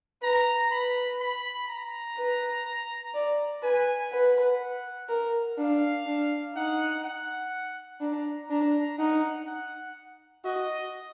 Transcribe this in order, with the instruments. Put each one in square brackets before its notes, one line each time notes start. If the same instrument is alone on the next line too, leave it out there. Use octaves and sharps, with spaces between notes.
[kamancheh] B4 [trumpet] A#5
[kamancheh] B4 [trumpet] B5
[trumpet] B5
A#5
[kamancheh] B4
D5
[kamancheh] B4 [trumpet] G#5
[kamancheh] B4 [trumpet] F#5
[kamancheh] A#4
[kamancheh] D4 [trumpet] F5
[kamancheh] D4
[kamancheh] D#4 [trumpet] F#5
[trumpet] F#5
[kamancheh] D4 [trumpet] A#5
[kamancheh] D4 [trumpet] A#5
[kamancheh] D#4 [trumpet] F#5
[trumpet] F#5
[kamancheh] F#4 [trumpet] D#5